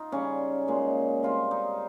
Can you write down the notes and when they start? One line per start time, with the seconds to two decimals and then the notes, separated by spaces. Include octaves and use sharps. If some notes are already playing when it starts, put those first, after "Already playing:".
Already playing: D#4 F4
0.12 C#3 G3 C#4
0.68 A#2 G#3
1.23 C3 G3 F4
1.51 D#4